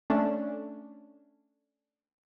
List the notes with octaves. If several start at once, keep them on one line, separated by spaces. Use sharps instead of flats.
A3 C#4 D4